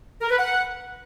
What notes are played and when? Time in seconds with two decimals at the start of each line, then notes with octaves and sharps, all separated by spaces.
0.21 A#4
0.30 B4
0.39 F#5